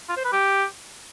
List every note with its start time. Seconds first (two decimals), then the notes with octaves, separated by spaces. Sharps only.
0.09 F4
0.17 C5
0.25 B4
0.33 G4